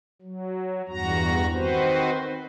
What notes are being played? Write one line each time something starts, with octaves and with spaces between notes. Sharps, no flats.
F#3
E2 G2 F#4 A#5
D#3 C4 F#4 B4 C5